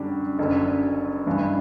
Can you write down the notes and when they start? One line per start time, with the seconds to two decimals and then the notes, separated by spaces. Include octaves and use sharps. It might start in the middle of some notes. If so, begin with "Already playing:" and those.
Already playing: F#2 D3 G3 D4
0.39 F#1 F#2 D3
1.26 A1 G2 E3